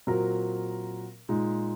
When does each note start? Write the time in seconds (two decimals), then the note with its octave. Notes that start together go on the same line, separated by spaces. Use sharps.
0.07 A#2 F#3 C4 F#4 A#4
1.29 A#2 G#3 D#4